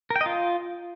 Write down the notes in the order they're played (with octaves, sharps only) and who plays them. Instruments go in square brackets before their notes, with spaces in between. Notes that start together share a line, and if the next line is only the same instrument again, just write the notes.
[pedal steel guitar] A#4
G5
D#5
F4